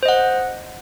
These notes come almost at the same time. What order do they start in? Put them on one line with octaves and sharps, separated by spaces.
C5 D#5 F#5